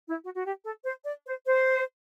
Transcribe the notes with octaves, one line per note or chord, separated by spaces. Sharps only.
E4
F#4
F#4
G4
A4
C5
D5
C5
C5